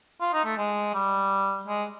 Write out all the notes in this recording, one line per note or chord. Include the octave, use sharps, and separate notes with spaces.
F4
D#4
A3
G#3
G3
G#3